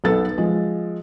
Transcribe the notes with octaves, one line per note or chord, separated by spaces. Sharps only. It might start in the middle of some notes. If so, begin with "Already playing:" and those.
B1 B3 A4 A6
F3 G#3